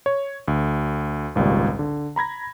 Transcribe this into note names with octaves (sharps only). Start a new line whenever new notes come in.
C#5
D2
G#1 C#2 A#2 G3
D3
A#5 B5 G#6 A#6